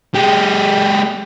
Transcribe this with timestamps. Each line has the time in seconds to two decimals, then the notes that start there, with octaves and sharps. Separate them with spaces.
0.14 G#3 G4